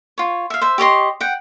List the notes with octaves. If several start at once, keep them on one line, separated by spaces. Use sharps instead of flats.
F4 C#5
E5 F5
C5 E5
G4 C#5 D#5 C6
F#5 G5